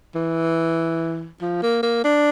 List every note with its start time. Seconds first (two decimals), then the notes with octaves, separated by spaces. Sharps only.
0.15 E3
1.41 F3
1.63 A#3
1.83 A#3
2.05 D4